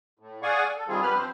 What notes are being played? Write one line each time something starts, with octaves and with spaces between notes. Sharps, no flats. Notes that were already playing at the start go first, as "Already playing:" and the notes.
A2
G#4 D5 F5 F#5 G#5 C#6
A4
C3 D#3 G3 C4 F4 G#4
G2 B3 G4 B4 B5 F6
F3 C4 C5